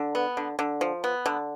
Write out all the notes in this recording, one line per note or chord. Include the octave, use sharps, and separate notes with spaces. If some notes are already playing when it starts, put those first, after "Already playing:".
Already playing: D3
B3
D3
D3
F3
B3
D3